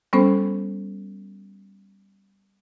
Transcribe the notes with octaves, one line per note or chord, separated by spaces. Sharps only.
G3 B3 C#4 A4 C5